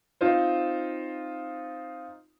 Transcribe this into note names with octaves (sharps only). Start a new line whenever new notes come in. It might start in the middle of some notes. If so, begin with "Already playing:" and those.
C4 D#4 F4 C5